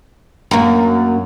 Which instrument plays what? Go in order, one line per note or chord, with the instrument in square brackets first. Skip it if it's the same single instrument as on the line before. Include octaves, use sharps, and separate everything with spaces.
[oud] F#2 A#3